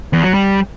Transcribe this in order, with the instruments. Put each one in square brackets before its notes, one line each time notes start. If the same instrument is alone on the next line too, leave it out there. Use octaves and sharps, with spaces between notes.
[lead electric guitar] E2
F#3
G3